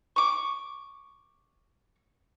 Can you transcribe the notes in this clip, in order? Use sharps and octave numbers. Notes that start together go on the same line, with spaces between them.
C#6 D6